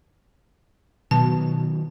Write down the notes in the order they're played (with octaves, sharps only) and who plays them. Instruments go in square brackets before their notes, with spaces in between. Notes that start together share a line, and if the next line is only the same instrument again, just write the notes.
[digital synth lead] B2 [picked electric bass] D#3 F#3 [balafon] A5